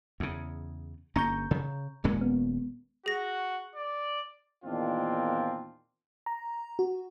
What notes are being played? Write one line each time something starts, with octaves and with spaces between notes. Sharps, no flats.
E2 C#3
G1 A#3 C#4 A#5 C#6 G6
C#3
D#1 A#2 G#3 C#4
B3
F#4 G#4 A#6
D5
E2 A#2 D#3 C4 D4 F4
A#5
F#4